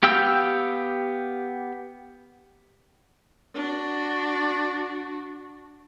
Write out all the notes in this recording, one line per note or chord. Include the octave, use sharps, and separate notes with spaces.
B3 G4 F5 G5 E6
D4 F#4